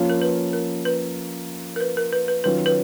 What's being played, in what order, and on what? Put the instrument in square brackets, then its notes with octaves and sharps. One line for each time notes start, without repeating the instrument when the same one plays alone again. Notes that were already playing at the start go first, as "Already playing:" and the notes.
Already playing: [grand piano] F3 A#3 C#4 F4
[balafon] A#4
B4
A#4
B4
A#4
B4
A#4
B4
B4
[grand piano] D#3 F#3 C#4 F4 [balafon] B4
[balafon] B4